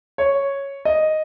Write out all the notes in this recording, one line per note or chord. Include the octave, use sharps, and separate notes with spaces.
C#5
D#5